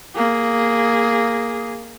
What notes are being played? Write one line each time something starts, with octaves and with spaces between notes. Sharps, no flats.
A#3 G#4